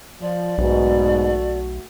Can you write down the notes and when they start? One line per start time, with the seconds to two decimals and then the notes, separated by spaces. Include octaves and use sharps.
0.21 F3 D5
0.58 B1 G#2 B2 A3 F#4